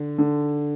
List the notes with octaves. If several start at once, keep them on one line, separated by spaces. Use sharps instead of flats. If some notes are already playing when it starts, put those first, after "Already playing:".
Already playing: D3
D3